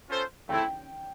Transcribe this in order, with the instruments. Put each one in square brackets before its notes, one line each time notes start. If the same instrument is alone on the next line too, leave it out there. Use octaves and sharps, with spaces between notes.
[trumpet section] C#4 F4 A4 C5
[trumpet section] A3 C4 E4 A4 [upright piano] G5